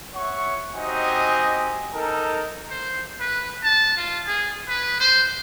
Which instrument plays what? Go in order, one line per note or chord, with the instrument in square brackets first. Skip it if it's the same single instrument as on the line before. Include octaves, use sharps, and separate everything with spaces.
[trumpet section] C#5 E5 F#5 C#6
C4 D#4 F#4 G4 D#5 G#5
D#4 A4 A#4
[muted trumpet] C5
B4
A5
F4
G#4
B4
C5